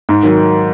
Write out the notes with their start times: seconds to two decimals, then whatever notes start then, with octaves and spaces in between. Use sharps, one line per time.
0.09 G#2
0.23 D#3 F#3